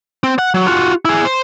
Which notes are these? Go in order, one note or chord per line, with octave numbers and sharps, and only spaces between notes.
C4
F#5
F#3
F4 F#4
E4 G#4
C5